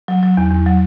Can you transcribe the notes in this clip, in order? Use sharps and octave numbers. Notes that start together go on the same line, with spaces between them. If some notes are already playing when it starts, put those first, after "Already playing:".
F#3
F#3
E2
E2
F#3